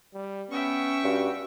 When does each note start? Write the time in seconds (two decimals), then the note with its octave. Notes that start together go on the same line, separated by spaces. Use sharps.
0.14 G3
0.50 B3 C#4 E5 G5 C#6
1.04 G2 F#4